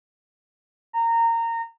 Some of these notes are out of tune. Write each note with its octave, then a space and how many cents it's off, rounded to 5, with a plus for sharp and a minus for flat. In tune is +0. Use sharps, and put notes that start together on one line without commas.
A#5 -20